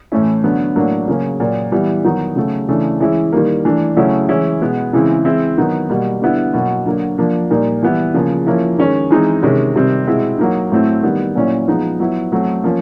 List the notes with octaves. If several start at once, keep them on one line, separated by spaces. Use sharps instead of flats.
A2 E3 A3 C#4 E4
D3 F#3 B3
A2 F#3 A#3 D4
C#3 F#3 A#3 C#4
A#2 F#3 A#3
E3 G3 B3 E4
D#3 F#3 B3 D#4
C#3 F#3 A3
C#3 E3 A3 D4
E3 G#3 C#4 E4
D#3 G3 A#3
E3 A3 D4
C#3 F#3 A3 C#4 E4
E3 G#3 C#4 E4
B2 G#3 B3
C#3 E3 G#3 C4 E4
E3 G#3 C4 E4
D#3 F#3 B3 D#4
B2 G3 A#3
D3 G3 B3 E4
B2 F#3 A#3
D3 F#3 A#3
F3 A#3 D4
A#2 G3 A#3 D#4
E3 G3 B3 E4
C#3 F3 A#3
F3 A#3 C#4 E4
D#3 G#3 C#4
E3 G#3 C4 D#4
C3 D#3 G#3 C#4
C3 D#3 G3 C4
B2 G#3 C4 E4
F#3 A#3 D#4
A2 F#3 A3 C4 E4
D#3 G3 B3
A#2 F#3 A#3 C#4 E4
F3 G#3 B3 D#4
F#3 B3 E4
F#3 A3 C4
F3 A#3 C#4